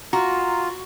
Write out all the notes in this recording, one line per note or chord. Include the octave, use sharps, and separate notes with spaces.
F4 F#4 A#5